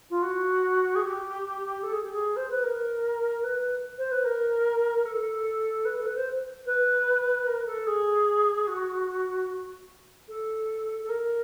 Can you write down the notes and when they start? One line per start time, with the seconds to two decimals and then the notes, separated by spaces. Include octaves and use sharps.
0.10 F4
0.22 F#4
0.95 G#4
1.02 G4
1.83 A4
1.92 G#4
2.02 G4
2.12 G#4
2.36 C5
2.49 B4
2.63 A#4
3.43 B4
3.98 C5
4.11 B4
4.24 A#4
5.05 A4
5.85 B4
5.96 A4
6.05 B4
6.16 C5
6.66 B4
7.46 A#4
7.66 A4
7.86 G#4
8.67 F#4
10.28 A4
11.03 A4
11.09 A#4